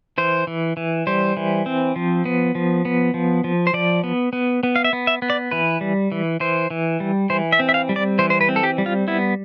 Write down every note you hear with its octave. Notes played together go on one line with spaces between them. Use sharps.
E3 C5
E3
E3
G3 C5
E3
C4
F3
B3
F3
B3
F3
F3
C5
F3 D5
B3
B3
B3
F5
E5
B3
E5
B3
D5
E3 B4
G3
E3
E3 C5
E3
G3
E3 C5
E5
C4
E5
F5
G3
D5
E3 C5
C5
B4
C4
A4
G4
G3
F4
B3 E4